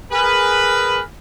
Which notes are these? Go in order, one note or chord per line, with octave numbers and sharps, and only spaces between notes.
G#4 A#4 B4